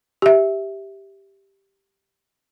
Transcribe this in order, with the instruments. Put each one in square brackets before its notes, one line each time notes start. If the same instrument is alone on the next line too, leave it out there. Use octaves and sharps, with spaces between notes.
[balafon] G4 E5